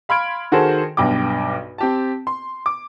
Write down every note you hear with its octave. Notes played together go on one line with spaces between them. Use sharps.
F5 B5 C6 F6 G#6 D7
D#3 F#4 G#4 A4 C5
B1 G2 G5 D6
C4 G4 A5
C6
D6